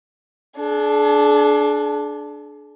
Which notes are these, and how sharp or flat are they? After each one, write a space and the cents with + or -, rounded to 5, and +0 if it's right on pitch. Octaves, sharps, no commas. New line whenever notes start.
D4 +0 G#4 +40